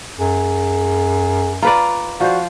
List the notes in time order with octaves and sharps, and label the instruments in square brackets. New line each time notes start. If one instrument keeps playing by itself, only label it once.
[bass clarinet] F#2 [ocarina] G#4
[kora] F4 B4 D5 [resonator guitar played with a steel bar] A#5
[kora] F3 C5 [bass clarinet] F#4 [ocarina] D5